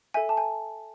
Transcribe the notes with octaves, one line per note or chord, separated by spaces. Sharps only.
A4 E5 G#5
A5
G#5